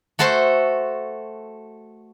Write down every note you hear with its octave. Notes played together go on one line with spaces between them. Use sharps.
A3 F#4 A4 C5 C6